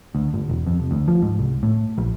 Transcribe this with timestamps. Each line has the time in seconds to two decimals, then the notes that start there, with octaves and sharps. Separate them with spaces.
0.15 D2
0.34 G1
0.49 E1
0.66 F2
0.80 F1
0.91 D2
1.08 F3
1.22 G#2
1.39 C2
1.63 A2
1.98 A#1